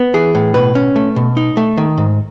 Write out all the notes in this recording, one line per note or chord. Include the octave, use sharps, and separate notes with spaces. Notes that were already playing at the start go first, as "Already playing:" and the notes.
Already playing: B3
E3 G#4
A2
B2 B4
C#4
A3
B2
D#4
A3
D#3
G#2